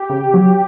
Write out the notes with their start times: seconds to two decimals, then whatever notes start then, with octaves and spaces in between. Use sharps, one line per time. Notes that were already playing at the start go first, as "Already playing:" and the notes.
Already playing: G4
0.10 C#3
0.34 F#3